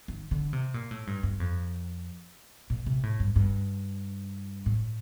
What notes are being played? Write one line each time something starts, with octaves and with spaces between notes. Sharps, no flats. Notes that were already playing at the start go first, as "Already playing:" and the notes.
D#3
D3
C3
A#2
A2
G2
G2
F2
A#2
C3
A2
G2
G2
A2